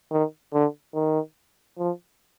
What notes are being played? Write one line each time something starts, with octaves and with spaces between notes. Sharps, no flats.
D#3
D3
D#3
F3